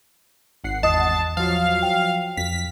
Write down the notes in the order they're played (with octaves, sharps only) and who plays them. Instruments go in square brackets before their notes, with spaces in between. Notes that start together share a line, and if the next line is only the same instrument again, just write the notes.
[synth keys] G#1 F#5 C7
[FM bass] E2 [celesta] D#5 D#6 [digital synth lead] A5
[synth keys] F3 F#3 [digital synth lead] F5
[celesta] G5
[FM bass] F2 [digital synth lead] B6